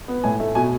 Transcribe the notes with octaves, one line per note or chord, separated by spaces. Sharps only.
B3
A2 G#5
A3
B2 G#5